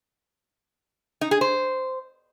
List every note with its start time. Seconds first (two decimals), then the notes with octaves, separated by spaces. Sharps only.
1.21 D#4
1.31 G#4
1.41 C5